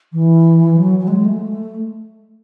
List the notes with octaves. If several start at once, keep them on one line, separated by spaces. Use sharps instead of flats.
E3
F#3
F#3
G#3
A3